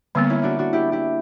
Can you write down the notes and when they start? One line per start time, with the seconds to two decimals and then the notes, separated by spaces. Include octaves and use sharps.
0.15 D3 G3 A#3 B3 C#4
0.30 C#4 E4
0.43 D4 F#4
0.59 D4 F#4
0.73 E4 G4
0.92 E4 G4